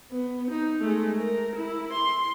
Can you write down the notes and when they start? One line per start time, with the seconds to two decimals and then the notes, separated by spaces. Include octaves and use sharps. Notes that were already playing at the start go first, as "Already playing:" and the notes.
0.12 B3
0.51 D#4
0.81 G#3 A3
1.18 A#4
1.56 E4
1.93 C6